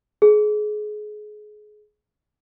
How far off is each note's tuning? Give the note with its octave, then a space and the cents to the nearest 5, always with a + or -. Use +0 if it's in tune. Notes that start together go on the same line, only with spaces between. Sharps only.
G#4 +25